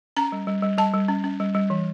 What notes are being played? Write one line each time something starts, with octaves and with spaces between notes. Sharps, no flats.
C#4 A#5
G3
G3
G3
G3 A5
G3
C#4
C#4
G3
G3
E3